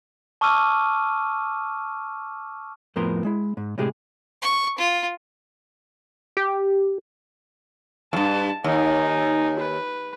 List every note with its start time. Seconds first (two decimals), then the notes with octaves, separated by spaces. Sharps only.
0.41 A5 C#6 D6 E6 F6 D#7
2.96 F2 A2 F3 B3 A#4 C6
3.24 G#3 E4
3.57 G#2
3.78 A2 C3 G#3 G4 G#4
4.42 C#6
4.78 F4
6.37 G4
8.13 E2 G2 A5
8.64 D#2 D#4 G#5
9.59 B4